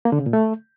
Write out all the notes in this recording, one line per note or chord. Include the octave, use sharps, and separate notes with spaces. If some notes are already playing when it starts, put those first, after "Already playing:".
A#3
D3
C#3
A#2
A3